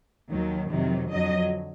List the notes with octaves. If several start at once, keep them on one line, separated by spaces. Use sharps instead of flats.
D#2 D#3 F#3
F2 C3 D#3 F#3
F2 D3 F#3 D#5